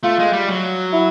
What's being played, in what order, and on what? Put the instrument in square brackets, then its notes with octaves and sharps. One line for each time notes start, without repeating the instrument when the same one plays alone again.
[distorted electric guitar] A3 [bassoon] F4
[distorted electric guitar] G#3
G3
F#3
[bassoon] E4